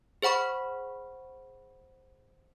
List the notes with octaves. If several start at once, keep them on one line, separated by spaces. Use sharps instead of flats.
G#4 C5 F#5 B5 C#6